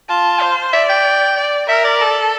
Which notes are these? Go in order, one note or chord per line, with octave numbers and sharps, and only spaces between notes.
F4 A5
C5
D5 E5
G5
D5
A#4 E5
D5
A4